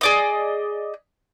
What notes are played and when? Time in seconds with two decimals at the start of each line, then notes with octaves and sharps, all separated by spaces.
0.01 G#4 D5 D#5